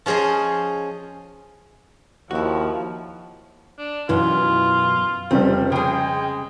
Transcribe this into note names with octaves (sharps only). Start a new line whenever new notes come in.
F3 C#4 G#4 C5 D#5
D#2 F3 E4 F#4
D4
B1 F#2 E3 F4
F1 C#3 G3 C4
C#3 G#3 G#4 G5